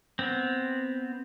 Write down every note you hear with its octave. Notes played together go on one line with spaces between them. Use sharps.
B3 C4